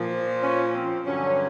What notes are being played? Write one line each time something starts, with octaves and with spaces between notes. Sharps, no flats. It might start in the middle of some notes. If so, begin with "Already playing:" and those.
Already playing: A#2 F3
C#4
C4
G2 D3 F#3 C#4